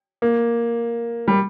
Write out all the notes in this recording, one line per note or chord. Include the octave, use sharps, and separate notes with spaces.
A#3
G3